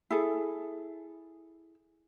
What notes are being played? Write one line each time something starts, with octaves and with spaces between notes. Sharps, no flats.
E4 G#4 A4